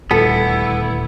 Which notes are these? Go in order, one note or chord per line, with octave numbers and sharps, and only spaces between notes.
D#1 D2 D3 G3 B3 E4 A4